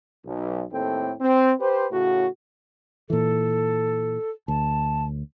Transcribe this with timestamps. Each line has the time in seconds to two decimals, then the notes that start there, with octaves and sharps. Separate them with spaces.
0.25 B1
0.72 D#2 A2 C4 A4 G5
1.21 C4
1.60 G4 B4 C5
1.92 A2 C#3 F#4
3.10 A#2 E3 A4
4.48 D2 A5